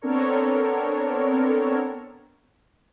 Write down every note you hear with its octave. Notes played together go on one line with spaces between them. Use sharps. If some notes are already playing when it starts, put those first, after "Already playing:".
B3 C4 D4 A4 A#4 C#5